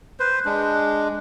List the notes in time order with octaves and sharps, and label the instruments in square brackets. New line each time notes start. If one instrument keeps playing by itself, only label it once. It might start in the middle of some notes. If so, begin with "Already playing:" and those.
[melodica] B4 C5
G#3 D4